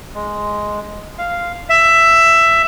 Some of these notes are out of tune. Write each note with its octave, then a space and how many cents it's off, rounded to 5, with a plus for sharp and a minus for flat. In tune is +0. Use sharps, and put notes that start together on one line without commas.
G#3 +5
F5 -5
E5 +10